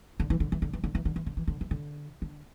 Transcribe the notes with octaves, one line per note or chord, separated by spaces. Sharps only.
D3
E3
D3
E3
D3
E3
D3
E3
D3
E3
D3
E3
D3
E3
D3
D3